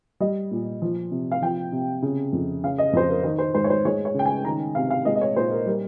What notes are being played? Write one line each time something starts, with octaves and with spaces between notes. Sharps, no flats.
G3 D#5
A#2
F3
C3
F5
F3 G5
C3
C#3
F2
C#3 F5
D#5
F2 C5
A#4
D#3 C5
C5
G#2 C5
C#5
C5
G#3 C#5
C#5
C#3 G5
G#5
D#3 A#5
C3 F5
F5
G#3 D#5
D#5
C#5
A#2 C5
A#4
G3 A#4